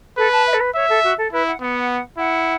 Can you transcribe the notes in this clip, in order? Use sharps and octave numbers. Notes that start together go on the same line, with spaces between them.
A4 B4
A5
E5
A4
B4
C#5 E5
A4
F#4
A4
E4 B4
F#5
B3 F#5
E4 F#5